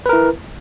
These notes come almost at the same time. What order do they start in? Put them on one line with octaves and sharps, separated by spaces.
B4 A#4 E4